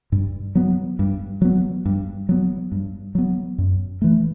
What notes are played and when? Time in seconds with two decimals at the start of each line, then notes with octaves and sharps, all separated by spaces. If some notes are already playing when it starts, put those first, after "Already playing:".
0.12 G2
0.55 F#3 B3
0.99 G2
1.42 F#3 B3
1.85 G2
2.29 F#3 B3
2.72 G2
3.15 F#3 B3
3.58 F#2
4.02 E3 A3